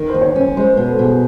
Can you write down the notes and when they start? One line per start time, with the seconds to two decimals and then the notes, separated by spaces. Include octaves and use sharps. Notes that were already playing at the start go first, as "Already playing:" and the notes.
Already playing: D#3 A#4
0.10 D#2 C5
0.21 C#5
0.25 C5
0.36 C#4
0.41 C#5
0.57 G#3 C5
0.73 B2 B4
0.88 A4
0.99 B2 G#4